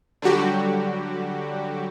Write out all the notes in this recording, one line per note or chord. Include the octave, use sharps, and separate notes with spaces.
D3 F#3 G3 F#4 G4